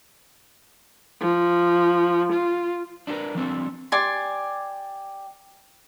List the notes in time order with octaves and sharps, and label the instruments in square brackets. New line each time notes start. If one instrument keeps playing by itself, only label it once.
[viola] F3
F4
[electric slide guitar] D4 E4 F4 A#4 B4
F3 G3 C4 D4
[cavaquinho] G4 D5 G#5 C6